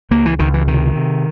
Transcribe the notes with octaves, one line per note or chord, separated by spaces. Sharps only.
C#2 A#3
E3
C#2 D#3
E3
C3 D#3
C3